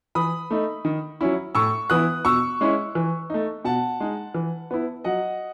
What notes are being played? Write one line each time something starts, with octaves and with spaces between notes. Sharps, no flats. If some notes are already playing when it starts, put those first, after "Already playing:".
E3 B5 D#6
A3 D#4
D#3
F#3 C#4 E4
A2 C#6 E6
E3 B3 E4 D#6 F#6
B2 C#6 E6
G#3 C#4 E4
E3
A3 D#4
B2 F#5 A5
G#3 D#4
E3
B3 E4
F#3 D#5 F#5